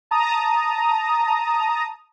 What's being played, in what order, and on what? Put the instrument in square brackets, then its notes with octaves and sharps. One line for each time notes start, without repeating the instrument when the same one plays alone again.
[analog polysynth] A5 A#5 D#6